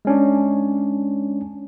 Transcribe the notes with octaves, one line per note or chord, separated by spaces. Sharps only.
G#3 C#4 D4